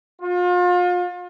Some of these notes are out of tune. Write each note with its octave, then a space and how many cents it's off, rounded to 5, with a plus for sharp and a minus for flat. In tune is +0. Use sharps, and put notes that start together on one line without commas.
F4 +35